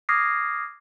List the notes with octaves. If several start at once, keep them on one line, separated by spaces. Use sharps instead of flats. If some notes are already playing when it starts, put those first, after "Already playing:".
D6 D#6 F6 G#6 A#6 C7